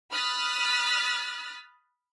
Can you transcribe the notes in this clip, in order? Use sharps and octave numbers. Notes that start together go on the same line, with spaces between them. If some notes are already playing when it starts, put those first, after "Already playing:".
B5 D#6 F6 F#6 A6 B6